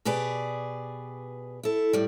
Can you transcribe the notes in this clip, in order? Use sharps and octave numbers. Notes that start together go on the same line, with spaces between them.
B2 G4 G#4 B4 D5
E4 A4
A2 G3